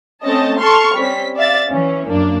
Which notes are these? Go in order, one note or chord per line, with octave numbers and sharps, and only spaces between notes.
A3 C4 C#4 D#5 A5
A4 A5 C6 C#6 F6
G3 C4 C#4 B6
D5 E5 F5 A6
E3 C#4
F#2 A#3 D4